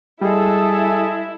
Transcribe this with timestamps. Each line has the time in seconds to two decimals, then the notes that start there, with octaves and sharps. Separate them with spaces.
0.21 G3 G#3 E4 G#4 A4